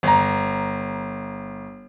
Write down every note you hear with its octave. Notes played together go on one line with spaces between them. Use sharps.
G1 A#5